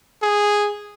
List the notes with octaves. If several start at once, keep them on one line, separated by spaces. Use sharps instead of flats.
G#4